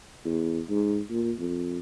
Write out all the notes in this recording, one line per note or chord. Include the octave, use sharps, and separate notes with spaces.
E2
G#2
A#2
F2